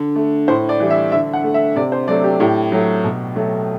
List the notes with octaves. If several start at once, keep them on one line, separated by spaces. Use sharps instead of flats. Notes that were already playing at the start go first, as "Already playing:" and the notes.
Already playing: D3
A3
A2 C5
D5
E3 G3
E5
D3 E5
F#5
A3
E5
C3 D5
C5
F#3 A3 D5
G4
A2 G4
F#3 A3
B2
F#3 A3